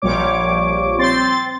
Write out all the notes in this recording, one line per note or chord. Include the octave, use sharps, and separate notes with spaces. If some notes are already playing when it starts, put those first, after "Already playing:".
A#1 F3 G3 C#5 D6
C4 C6 A6